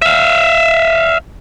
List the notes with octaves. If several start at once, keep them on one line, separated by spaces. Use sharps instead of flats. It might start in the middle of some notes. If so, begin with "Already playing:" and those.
E5 F5